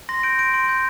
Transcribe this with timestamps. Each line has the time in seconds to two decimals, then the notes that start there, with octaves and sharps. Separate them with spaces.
0.09 C6 A#6
0.23 G6 D7
0.38 C6 D7
0.54 C6 D7
0.69 G6